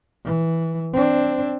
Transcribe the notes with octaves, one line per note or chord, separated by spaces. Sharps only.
E3
C4 D4